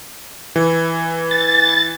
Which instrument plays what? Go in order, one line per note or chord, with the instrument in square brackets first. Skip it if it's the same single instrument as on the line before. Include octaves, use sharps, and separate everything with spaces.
[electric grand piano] E3
[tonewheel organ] A6